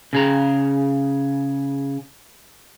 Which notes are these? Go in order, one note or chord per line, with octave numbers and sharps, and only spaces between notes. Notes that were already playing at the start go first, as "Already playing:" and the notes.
C#3 G#4 A#5